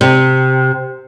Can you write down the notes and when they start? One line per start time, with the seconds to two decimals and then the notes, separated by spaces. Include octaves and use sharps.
0.01 C3